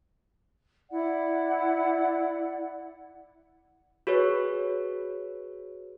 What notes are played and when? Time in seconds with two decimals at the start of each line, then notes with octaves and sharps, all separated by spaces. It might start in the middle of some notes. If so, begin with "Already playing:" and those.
0.90 E4 D5 F#5
4.07 F#4 G#4 B4 C#5